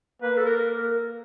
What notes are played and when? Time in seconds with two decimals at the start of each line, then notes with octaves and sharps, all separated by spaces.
0.22 A#3 B4
0.37 A4
0.45 A#4